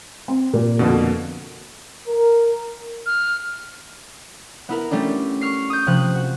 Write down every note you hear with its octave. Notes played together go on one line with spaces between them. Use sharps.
C4
A#2
F2 B2 D3 A#3 F#4
A#4
F6
B3 E4 A#4
G3 A3 C#4 D4
C#6 F6 C7
D#6 G6
C3 F3 F#6
F#4